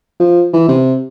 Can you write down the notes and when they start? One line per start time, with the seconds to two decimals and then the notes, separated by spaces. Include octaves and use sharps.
0.20 F3
0.53 E3
0.68 C3